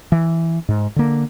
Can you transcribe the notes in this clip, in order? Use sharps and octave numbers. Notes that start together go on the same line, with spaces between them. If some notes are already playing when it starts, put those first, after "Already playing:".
E3
G#2
D3 A#3